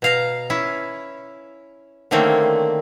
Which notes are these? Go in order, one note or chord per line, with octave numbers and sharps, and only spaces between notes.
B2 F5 A#5
C#4 E4
D3 D#3 A3 A#3 C4 C#4